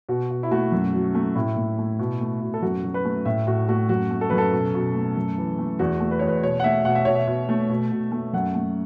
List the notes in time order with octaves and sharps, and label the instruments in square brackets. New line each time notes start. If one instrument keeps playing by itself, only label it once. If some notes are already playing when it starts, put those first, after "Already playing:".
[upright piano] B2 F#4
B2
E4
A3 F#4
F#2
F#3
A3
A2 E4
A2
A3
B2
A3
B2
A4
F#2 F#4
F#3
B4
A3
A2 E5
A2 F#4
A3 F#4
F#2 F#4
A3
A4
F#2 B4
A4
B2
B2
A3
F#2
E3
A3
E2 F#4
A3
B4
E2 C#5
B4
B2 C#5
F#5
A3 E5
B2 F#5
E5
B2 C#5
E5
B2
A3
B2
B2
A3
F#2 F#5
A3